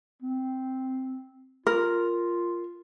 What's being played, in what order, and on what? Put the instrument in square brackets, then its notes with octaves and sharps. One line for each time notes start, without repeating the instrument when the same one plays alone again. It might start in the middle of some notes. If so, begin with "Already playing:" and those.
[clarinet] C4
[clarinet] F4 [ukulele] A#4